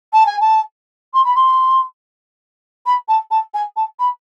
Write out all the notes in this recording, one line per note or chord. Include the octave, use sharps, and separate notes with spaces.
A5
G#5
A5
C6
B5
C6
B5
A5
A5
G#5
A5
B5